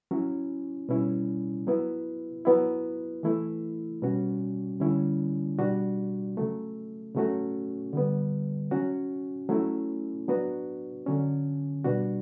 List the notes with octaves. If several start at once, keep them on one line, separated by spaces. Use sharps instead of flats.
F#3 C#4 E4
B2 G3 C#4 E4
F#3 B3 E4
F#3 B3 E4
E3 A3 E4
B2 G3 C#4 F#4
D3 G3 C#4 E4
B2 G3 D4 F#4
C#3 F#3 A3
C#3 F#3 A3 C#4 F#4
D3 G3 B3
F#3 C#4 F#4
F#3 A3 C#4 E4
F#3 B3 D4 F#4
D3 F#3 C#4
B2 G3 D4 F#4